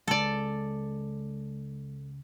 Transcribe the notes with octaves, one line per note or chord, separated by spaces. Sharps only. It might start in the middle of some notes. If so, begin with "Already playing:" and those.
C#2 G#3 A4 D5